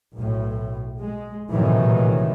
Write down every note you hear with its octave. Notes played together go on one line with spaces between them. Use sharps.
B1 A2
G#3
A#1 A2 C3 D#3 E3 F#3